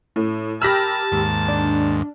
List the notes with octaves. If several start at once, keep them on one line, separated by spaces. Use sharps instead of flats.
A2
G4 A#4 A5 B5 E6 F6 A#6
D#2 G#2
D4